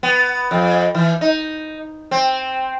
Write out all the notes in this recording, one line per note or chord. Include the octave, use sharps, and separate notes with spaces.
B3
F2
E3
D#4
C4